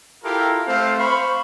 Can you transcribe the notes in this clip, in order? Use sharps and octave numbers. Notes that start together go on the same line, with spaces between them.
E4 F4 G4 A4 A#4 F5
A3 C4 C5 F5
C5 F5 B5 C#6